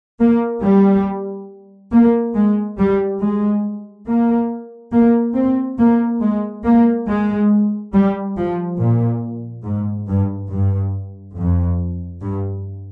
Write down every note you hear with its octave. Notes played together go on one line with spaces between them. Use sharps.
A#3
G3
A#3
G#3
G3
G#3
A#3
A#3
C4
A#3
G#3
A#3
G#3
G3
F3
A#2
G#2
G2
G2
F2
G2